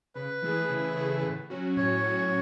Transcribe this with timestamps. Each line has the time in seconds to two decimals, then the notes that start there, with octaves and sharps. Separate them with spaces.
0.15 C#3 B4
0.42 E3 A3 E4 G#4
0.69 C#3
0.96 E3 A3 E4 G#4
1.23 A2
1.50 F#3 C#4 F#4
1.77 A2 C#5
2.03 F#3 C#4 F#4